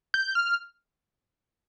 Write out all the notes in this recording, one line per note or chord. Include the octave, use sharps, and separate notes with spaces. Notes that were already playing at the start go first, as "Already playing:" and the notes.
G6
F6